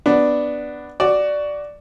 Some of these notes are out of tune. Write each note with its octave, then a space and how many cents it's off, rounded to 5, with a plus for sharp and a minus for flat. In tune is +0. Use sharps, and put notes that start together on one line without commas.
B3 +0 D4 +0
F#4 +15 D5 +0